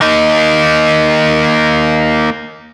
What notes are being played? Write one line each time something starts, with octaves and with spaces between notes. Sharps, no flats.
A#3 D#4